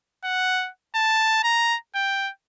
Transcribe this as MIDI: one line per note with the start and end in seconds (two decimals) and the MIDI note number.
0.25 0.69 78
0.95 1.40 81
1.44 1.77 82
1.95 2.30 79